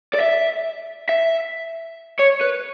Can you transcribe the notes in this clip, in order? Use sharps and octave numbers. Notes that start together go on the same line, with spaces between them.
D5
E5
E5
C#5
B4